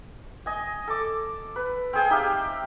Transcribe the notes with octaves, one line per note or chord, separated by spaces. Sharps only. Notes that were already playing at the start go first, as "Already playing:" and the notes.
D#5 G#5
A4 D6
B4
C4 G#4 G5
D#4 G4 E5 F5